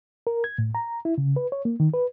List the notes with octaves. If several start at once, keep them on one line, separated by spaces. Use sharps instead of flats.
A#4
G#6
A2
A#5
E4
C#3
B4
C#5
A#3
D#3
B4